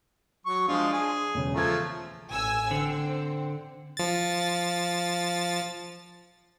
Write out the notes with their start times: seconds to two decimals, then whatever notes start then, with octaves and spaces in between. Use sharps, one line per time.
0.46 F#3 C#6
0.68 F3 G#3 D4 F4
0.93 G#4
1.34 E1 C#3
1.54 F3 A3 A#5 G#6
2.32 A1 G#5 E6
2.71 D3 C4
3.97 F3 A6